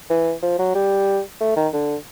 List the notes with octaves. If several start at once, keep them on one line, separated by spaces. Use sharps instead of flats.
E3
F3
F#3
G3
A3
D#3
D3